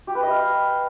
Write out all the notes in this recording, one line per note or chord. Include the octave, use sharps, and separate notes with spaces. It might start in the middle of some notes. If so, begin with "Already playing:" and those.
G4
B4
D#5
F5